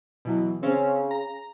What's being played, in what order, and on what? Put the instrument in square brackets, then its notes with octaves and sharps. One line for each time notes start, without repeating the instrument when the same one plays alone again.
[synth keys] B2 E3 F#3
[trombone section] C#3 [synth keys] C4 C#4
[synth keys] A#5